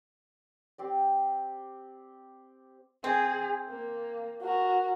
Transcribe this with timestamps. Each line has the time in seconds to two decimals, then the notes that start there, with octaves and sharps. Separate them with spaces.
0.78 C4 G4 D5
3.04 C4 G#4
3.69 A#3
4.42 F#4 A#4